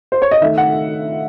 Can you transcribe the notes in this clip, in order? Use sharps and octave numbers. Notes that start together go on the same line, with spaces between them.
C5
C#5
D#5
D#3 A3 E5
F#5